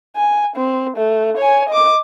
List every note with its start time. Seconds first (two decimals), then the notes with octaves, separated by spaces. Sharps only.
0.16 G#5
0.56 C4
0.96 A3
1.37 C#5 G#5
1.69 D#5 D6